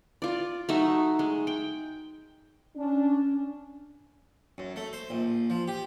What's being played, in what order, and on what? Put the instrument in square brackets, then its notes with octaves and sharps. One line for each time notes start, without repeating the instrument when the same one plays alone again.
[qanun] F4 D5
F#3 A3 D#4 E5
G#3
G5
[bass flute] C#4 [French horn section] D4
[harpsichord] F#2
A3
C5
A#1
F3
G4